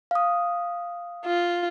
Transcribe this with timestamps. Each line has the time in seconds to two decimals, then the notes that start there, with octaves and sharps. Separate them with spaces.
0.11 F5 D#6
1.25 F4